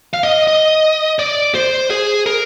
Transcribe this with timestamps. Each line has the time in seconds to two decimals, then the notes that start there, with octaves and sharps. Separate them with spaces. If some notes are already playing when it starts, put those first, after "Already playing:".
0.14 F5
0.23 D#5
0.48 D#5
1.19 D5
1.55 C5
1.90 G#4
2.26 A#4